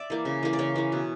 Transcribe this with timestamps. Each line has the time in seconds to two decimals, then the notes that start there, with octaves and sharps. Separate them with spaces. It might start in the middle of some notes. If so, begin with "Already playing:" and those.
Already playing: D5 E5
0.10 E3 A#3
0.25 C#3
0.43 E3 A#3
0.53 D5
0.59 C#3 C#5
0.76 E3 A#3
0.92 B2